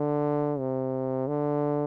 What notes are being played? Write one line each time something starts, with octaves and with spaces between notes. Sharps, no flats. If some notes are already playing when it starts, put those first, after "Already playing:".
Already playing: D3
C3
D3